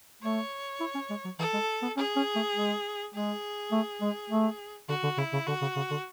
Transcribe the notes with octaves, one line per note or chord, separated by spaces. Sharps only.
A3 C#5
E4
C#4
G#3
F#3
E3 A4
G#3
B3
C#4 G#4
C#4
A3
G#3
G#3 G#4
A3
G#3
A3
D3 F#4
D3
C#3 E4
C#3
D3 F#4
C#3
C#3
D3